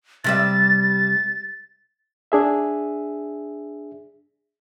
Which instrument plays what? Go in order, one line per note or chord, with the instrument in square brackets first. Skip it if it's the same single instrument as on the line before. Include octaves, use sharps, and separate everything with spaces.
[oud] C3 G3 E5 [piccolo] A6
[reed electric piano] D4 G#4 E5